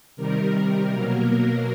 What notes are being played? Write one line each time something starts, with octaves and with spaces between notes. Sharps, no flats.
C3 D#3 G3 A#4
B2 F#3 A#3